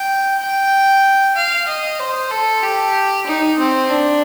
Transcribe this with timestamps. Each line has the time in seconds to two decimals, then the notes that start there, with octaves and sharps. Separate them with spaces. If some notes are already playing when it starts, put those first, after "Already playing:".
Already playing: G5
0.40 G5
1.36 F5
1.68 D#5
2.00 C5
2.31 A4
2.63 G4
3.27 D#4
3.59 C4
3.90 D4